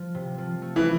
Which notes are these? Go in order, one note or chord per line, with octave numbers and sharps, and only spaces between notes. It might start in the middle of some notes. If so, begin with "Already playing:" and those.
Already playing: F3
C3
F3
A3
E3